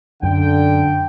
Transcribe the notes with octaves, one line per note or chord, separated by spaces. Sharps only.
F#2 D3 G5